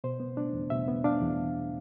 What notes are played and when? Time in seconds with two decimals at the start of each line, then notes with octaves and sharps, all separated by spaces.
0.04 B2 C5
0.20 B3
0.37 D4
0.53 E2
0.70 B2 E5
0.88 B3
1.04 D4 F5
1.21 E2